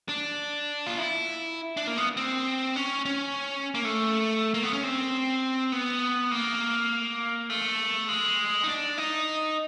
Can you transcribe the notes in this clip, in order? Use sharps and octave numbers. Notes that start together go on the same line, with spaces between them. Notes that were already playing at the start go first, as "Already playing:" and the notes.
D4
F4
E4
D4
A#3
B3
C4
C#4
C#4
A#3
A3
A#3
B3
C#4
C4
B3
A#3
A3
G#3
D#4
D4
D#4